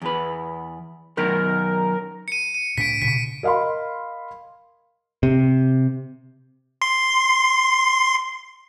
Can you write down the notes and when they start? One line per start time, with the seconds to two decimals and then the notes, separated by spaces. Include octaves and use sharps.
0.02 E2 B4
1.17 F#2 B2 D#3 A#4
2.28 C#7 D#7
2.54 D#7
2.78 A2 D4 B6 D7
3.02 A#2 C#3 B6
3.43 A#4 D#5 F5 B5 C6
5.23 C3
6.82 C6 C7